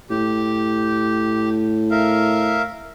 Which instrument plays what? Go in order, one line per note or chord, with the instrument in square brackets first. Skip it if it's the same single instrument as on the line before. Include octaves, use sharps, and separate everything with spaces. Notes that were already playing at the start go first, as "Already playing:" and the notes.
[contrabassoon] A2 [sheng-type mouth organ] G4
[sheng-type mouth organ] A#4 E5 F5